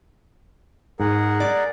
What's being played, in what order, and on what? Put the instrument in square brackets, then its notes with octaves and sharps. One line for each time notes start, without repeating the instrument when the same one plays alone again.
[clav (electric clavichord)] G#2 [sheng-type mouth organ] G#4 A#4 F#5
[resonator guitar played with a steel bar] D5